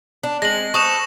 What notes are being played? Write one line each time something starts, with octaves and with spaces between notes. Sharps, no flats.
D4
G#3 C4 A#6 F#7
A4 B4 C5 C#6 D#6 E7